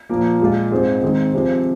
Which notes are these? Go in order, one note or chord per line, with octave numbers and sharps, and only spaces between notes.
A#2 F3 A#3
A#2 G#3 F4
G#2 G#3 C4 G#4 C5
D#3 G#3 C4 G#4
C3 F3 C4 G#4 C5